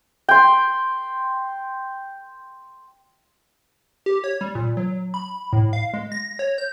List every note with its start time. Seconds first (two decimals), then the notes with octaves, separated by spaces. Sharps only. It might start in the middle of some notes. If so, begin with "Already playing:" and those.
0.29 G5 C6
4.06 G4
4.24 C#5
4.41 G3
4.55 A#2
4.77 F#3
5.14 B5
5.53 A2
5.73 F5
5.94 G#3
6.12 A#6
6.39 C#5
6.58 G6